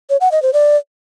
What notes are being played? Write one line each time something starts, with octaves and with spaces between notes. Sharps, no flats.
C#5
F#5
D#5
C5
D5